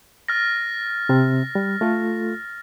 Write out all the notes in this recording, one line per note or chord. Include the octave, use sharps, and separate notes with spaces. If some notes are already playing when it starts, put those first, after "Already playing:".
F6 A6 A#6
C3 C4
G3
A3 F4 A4